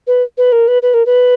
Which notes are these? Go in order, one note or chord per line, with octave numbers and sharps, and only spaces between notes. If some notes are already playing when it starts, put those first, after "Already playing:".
B4
B4
A#4
B4
B4
A#4
B4